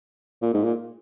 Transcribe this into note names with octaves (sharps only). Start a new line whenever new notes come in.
A#2
G#2
A#2